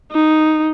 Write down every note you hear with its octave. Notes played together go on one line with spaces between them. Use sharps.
D#4